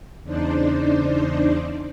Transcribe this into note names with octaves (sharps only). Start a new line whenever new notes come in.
E2 C#3 D4 D#4 C5 D5